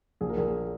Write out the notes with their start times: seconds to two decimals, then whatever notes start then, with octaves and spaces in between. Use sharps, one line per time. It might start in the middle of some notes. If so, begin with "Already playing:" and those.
0.21 A#1 G#4
0.29 A#4
0.38 A#1 G#4